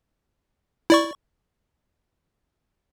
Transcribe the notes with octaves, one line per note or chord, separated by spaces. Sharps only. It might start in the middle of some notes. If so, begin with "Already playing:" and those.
E4 D5 C#6